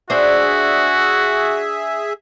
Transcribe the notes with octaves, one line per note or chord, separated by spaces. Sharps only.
D4 F#4 G#4 C5 E5